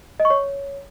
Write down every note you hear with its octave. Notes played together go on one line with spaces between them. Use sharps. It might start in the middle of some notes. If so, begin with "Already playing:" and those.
D#5
C#6
C#5